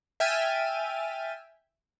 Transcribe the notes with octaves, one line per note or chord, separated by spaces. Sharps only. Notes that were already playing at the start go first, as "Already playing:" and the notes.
E5 G5 G#5 F6 A6 D#7